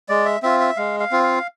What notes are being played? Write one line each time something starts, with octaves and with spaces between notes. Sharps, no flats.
G#3 D5
E5
C4 F4 E5
E5
G#3 F5
F5
C4 F4
F5